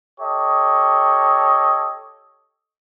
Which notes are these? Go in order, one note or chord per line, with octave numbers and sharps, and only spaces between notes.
G4 A4 C#5 D#5